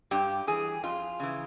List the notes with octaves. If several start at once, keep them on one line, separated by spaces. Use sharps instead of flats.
G2 G4
E3 G#4
F2 F4
C#3 E3